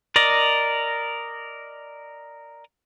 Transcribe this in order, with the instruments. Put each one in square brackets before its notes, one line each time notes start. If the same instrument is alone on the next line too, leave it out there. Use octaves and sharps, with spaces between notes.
[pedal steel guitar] A#4 D5 D#5